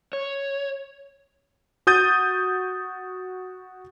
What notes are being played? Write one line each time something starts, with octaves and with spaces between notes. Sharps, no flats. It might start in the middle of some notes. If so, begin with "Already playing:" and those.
C#5
F#4 D#6 G6 A6 D#7